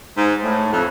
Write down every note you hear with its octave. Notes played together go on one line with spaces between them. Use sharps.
G#2
A2
F2